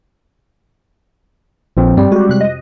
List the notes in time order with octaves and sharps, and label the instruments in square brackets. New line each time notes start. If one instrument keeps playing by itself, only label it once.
[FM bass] A#1 [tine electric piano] A#2 F3 C4
[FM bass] G2 [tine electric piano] G3 [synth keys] C4
[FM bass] G#3 [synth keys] F#4 G4
[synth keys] F2 C3 F#6
D#5